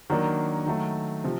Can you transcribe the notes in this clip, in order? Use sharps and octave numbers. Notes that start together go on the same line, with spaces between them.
D#3 F#3 A#3 D4
D#3 F#3 A3
C3 F3 C4